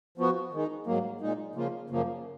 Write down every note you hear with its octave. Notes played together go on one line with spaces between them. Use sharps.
F3 B3 F#4
D#3 G#3 D#4
G#2 F#3 A#3
A#2 G#3 D#4
C#3 F3 A#3 F4
F#2 C#3 F3 A#3